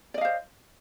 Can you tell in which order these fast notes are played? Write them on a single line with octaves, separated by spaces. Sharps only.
D5 D#5 F5 C5